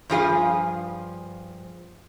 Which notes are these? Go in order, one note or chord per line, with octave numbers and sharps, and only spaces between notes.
G2 F3 G#4 F5